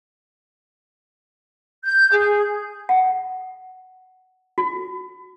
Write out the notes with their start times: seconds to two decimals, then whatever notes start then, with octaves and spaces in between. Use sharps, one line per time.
1.84 G6
2.11 G#4
2.89 F#5
4.58 F#4